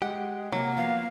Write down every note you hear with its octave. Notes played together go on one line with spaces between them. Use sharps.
G#3 G4 F#5
C3 F#3 A#3
F3 B3 F5